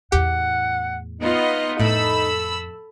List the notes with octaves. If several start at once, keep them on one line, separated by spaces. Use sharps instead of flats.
E2 A2 G4 F#5
B3 D#4 F4 D#5
F2 A2 A4 B5 E6